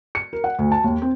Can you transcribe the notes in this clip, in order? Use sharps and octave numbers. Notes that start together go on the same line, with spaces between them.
C#7
A#4
F#5
D2
A5
D#2
C4